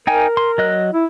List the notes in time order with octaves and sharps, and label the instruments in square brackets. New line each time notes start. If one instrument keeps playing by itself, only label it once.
[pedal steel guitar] D#4 G5 G#5 [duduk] A#4
[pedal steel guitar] C6
F#3 D#5 F#6
[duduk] E4